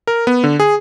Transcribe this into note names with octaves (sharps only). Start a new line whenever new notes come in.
A#4
B3
D3
G#4